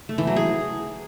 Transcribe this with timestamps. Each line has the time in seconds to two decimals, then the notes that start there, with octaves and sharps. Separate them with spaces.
0.09 A3
0.18 E3
0.27 F#3
0.36 G#4